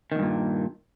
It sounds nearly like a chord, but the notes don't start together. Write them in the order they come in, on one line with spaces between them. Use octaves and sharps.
D#3 E2 G2 A#2